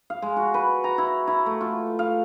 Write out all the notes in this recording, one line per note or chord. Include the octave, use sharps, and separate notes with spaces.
F5
G#3
F#4
B4
A#5
E4
E4
A3
F4
F5